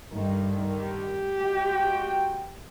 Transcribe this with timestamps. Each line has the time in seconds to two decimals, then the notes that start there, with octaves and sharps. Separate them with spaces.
0.13 G2 D3 D#3
0.81 G4
1.40 G#3 F#4 G5